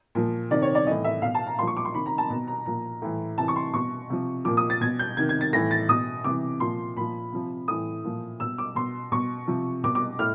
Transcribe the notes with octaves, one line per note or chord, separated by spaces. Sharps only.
A#2 F3
C3 D#3 D5
C#5
D5
A2 E3 D#5
E5
B2 F5
A5
A#5
A#2 F3 C6 C#6
D6
C6
C3 D#3 B5
A#5
A5
B2 A#5
A#5
A#2 F3 A#5
A2 E3
C3 E3 A5
C#6
C6
B2 C#6
C3 F3
A#2 F3 D6
D#6
A6
B2 G#6
G6
C3 D#3 G#6
G#6
A6
A2 E3 A#6
A6
B2 D#6
C3 E3 D6
A#2 F3 C6
A#2 F3 B5
C3 F3
A2 E3 D#6
A#2 F3
B2 E6
D6
B2 C6
B2 C#6
C3 F3
B2 D6
D6
A2 F6